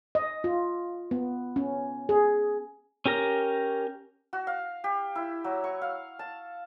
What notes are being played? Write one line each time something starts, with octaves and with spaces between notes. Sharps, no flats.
D#5
F4
B3
C#4
G#4
C#4 G4 A#4 A#5
F#4
F5
G4
E4
F#3
C#6
F5
A5